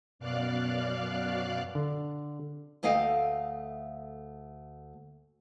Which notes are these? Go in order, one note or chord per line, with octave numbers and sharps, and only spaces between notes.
F#2 B2 D5 F5 F#6
D3
D2 A3 D#5 F5 G5